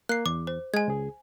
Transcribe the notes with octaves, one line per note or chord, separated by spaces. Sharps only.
A#3 F#6 C7
E2 D6
C5
G#3 G#5 G#6
C#2 G#4